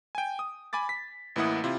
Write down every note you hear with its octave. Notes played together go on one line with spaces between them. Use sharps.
G5 G#5
D#6
G#5 B5 D6 A6
B6
A1 E3 A#3 E4 F#5 D#6
C3 E4 F4